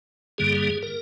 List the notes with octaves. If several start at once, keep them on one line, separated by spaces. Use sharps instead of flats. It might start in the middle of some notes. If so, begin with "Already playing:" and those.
G2 D3 G3 A#3 G#4
A#4